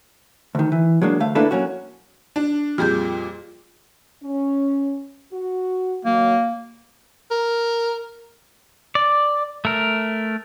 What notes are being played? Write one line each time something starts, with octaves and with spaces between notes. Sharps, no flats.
D2 D#3
E3
F#3 G#3 A#3 D4
D2 A3 F5
A3 A#3 D4 E4 A4 B4
F#3 A#3 C#4 F#4
D4
F2 A#2 G3 F4 G#4 G6
C#4
F#4
D#3 F#3 A#3
A#4
D5
A3 A#4